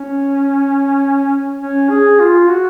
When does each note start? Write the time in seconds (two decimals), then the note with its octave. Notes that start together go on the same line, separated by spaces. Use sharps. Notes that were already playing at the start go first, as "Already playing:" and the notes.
Already playing: C#4
1.60 C#4
1.90 G#4
2.20 F4
2.50 F#4